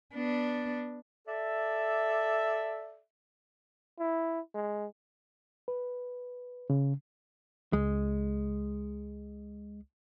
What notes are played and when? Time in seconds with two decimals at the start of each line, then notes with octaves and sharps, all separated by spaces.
0.14 B3 D4
1.28 A4 D5 E5
3.99 E4
4.54 G#3
5.68 B4
6.70 C#3
7.73 C#2 G#3